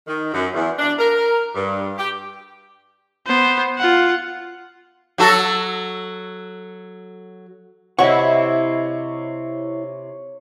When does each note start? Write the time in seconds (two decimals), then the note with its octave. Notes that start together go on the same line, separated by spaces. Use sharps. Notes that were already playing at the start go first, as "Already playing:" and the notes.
0.07 D#3
0.34 F#2
0.53 E2
0.79 D4
0.99 A#4
1.55 G2
1.98 G4
3.27 B3 C5
3.78 F4 F#5
5.18 F#3 F#4 A4
7.99 C3 E4 C#5 D#5 F#5 C#6